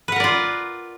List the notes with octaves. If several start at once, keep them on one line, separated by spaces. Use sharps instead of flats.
F4 A#4 B4 D5 F#5